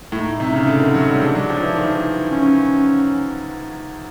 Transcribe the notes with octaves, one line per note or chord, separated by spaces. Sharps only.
A2 D#4
C3
C#3
D3
D#3
F#3
G3
G#3 D4
F#3
F3
E3
D#3
C#4